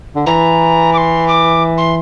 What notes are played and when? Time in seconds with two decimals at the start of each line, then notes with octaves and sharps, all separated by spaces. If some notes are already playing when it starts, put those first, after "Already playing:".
0.15 D3
0.26 E3 A#5
0.93 D6
0.98 C6
1.28 D6
1.78 C6